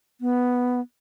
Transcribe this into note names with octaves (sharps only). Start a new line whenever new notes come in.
B3